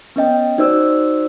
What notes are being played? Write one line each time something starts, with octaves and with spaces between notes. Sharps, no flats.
B3 C#4 D#5 G5
D#4 F#4 C5 D5 E6